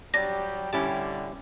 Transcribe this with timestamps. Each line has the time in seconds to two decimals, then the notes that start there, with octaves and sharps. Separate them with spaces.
0.14 F#3 G3 D4 G4 A#6
0.73 D3 G3 C#4 E4 G4 A5